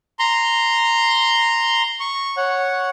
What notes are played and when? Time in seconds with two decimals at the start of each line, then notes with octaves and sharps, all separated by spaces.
0.19 A#5 C6
2.00 C#6
2.37 C#5 F#5